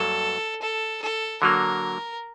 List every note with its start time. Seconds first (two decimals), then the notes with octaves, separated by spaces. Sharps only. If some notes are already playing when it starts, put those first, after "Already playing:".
Already playing: G2 F#3 A#3 A4
0.61 A4
1.02 A4
1.42 D3 F#3 A#3 A#4